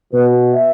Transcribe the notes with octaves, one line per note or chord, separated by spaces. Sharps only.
B2 B4
E5